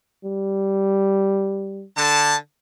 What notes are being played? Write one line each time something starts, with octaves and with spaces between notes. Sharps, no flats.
G3
D3 A5